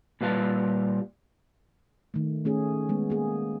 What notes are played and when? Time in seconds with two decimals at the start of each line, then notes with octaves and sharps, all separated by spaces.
0.21 A#2 G3 B4 F5 A5
2.14 D#3 A3
2.45 A3 C#4 G#4
2.89 G#3 B3
3.10 A#3 G#4